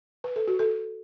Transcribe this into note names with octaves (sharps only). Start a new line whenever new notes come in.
B4
A4
F#4
A4